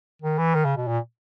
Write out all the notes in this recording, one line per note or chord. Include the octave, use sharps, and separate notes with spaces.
D#3
E3
D#3
C#3
B2
A#2